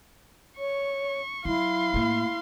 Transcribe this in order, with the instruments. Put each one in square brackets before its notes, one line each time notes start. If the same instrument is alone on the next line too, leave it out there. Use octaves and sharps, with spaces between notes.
[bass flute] C#5 [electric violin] C#6
[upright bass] F#3 [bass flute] E4 [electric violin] F5 C6
[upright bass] A2 A#3